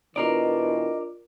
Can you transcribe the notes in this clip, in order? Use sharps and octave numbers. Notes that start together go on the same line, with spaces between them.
B2 E3 D4 F4 A#4 D5 D#5 A#5